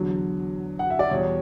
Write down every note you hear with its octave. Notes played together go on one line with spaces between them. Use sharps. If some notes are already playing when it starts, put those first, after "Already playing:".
Already playing: E2 D3 F#3
F#5
E5
D5
E2 B2 G3 C#5